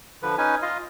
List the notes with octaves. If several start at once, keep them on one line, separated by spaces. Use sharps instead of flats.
D3 F3 B4
C#4 D#4 B4 G#5
F4 D#5 F5